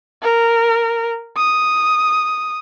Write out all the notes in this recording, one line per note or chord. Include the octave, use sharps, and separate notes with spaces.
A#4
D#6